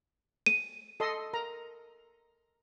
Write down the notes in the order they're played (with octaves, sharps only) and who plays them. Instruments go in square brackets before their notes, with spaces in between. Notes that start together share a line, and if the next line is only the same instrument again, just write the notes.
[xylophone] D#7
[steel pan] A4 D#5 C6
A#4 A#5